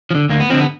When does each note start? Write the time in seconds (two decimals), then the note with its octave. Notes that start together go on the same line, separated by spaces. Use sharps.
0.11 F3
0.15 D3
0.29 D2 A#3
0.40 B3
0.50 D3 F3 C4
0.60 B3